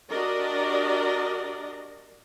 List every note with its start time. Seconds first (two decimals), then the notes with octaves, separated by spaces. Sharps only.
0.10 D4 F#4 G4 A#4 D5 D#5